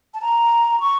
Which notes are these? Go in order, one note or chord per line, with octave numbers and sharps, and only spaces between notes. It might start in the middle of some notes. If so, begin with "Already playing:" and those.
A5
A#5
C#6